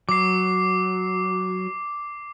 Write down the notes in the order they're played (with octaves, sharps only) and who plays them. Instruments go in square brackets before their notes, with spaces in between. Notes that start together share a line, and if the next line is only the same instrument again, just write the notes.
[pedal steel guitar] F#3 [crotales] D6 C7